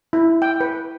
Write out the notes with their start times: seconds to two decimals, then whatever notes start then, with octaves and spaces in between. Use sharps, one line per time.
0.13 E4
0.42 G5
0.60 B4